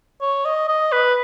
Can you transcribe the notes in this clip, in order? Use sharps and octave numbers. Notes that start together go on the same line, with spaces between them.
C#5
D#5
D#5
B4